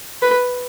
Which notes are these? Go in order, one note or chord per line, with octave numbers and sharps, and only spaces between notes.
B4